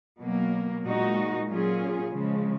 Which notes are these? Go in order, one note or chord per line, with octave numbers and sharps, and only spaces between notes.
B2 F#3 A#3
A#2 G#3 D#4 F#4
A#2 F#3 C#4 F4 G#4
C#3 F3 G#3